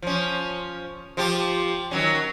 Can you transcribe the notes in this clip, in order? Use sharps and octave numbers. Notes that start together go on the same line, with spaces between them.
F3 C#4
F3 F4 G4
D#3 F#3 C#4